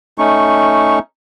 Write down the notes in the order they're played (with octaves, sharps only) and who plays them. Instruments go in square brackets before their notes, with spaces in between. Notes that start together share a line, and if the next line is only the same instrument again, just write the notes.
[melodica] A3 C#4 D#4 C#6